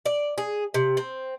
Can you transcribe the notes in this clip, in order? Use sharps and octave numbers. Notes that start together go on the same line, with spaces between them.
D5
G#4
C3
C4